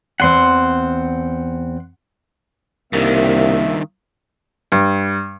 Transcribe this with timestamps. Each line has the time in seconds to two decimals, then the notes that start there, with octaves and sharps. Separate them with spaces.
0.20 E2 C4 F#5 C6
2.93 C2 G2 D#3 A#3 E5
4.72 G2